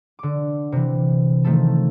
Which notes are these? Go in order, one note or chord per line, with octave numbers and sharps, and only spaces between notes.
D3 D6
C3 E3
D#3 F3 A3 A4